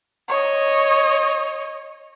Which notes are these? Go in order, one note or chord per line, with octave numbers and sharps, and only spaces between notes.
C#5 D#5